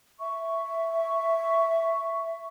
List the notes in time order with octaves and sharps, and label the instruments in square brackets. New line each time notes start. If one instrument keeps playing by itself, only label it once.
[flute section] E5 C#6